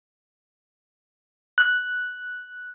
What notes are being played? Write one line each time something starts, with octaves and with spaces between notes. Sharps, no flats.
F#6